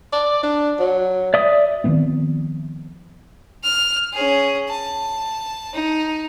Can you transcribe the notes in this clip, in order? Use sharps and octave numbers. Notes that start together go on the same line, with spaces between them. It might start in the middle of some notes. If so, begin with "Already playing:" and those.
D5
D4
F#3
D5 E5 D#6
D#3 F3 B3 C4
F6
C#4 G#4
A5
D#4